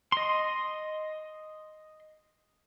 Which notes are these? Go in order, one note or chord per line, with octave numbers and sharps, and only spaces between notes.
D#5 C6